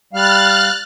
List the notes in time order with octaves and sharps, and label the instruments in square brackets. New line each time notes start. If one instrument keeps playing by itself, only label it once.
[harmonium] G3 F5 [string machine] F6 F#6 A6